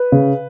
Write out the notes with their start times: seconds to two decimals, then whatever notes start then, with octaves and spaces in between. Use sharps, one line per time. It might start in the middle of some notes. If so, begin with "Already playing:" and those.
Already playing: B4
0.12 C#3